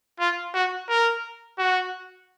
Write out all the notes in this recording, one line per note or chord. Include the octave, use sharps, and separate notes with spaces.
F4
F#4
A#4
F#4